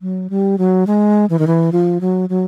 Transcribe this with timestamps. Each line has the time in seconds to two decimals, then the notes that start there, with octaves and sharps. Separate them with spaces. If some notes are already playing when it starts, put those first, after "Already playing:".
0.02 F#3
0.30 G3
0.58 F#3
0.87 G#3
1.30 E3
1.39 D#3
1.47 E3
1.72 F3
2.01 F#3
2.29 F#3